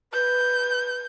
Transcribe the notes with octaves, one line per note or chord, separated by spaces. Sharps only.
B4 G6